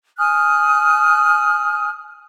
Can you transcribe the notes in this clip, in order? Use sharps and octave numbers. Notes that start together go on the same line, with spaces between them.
G#5 D#6 F6 F#6